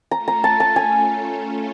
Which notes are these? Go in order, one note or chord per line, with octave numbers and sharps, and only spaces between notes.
A3 C#4 F4 A4 A#5
A#5
A5
A5
G#5